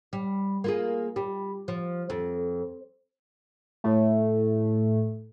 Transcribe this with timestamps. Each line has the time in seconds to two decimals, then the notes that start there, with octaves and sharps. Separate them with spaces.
0.13 G3
0.64 A#3 F4 G#4
1.16 G3
1.68 F3
2.10 F2
3.84 A2 A3